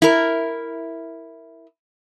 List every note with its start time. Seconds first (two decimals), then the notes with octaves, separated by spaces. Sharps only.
0.02 E4 A#4